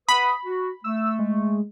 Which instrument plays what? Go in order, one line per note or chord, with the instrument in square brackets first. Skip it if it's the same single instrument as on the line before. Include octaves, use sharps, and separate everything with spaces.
[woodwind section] B4 F#5 D#6 [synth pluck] B5
[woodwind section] F#4
[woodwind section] A3 [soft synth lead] E6
[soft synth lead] G#3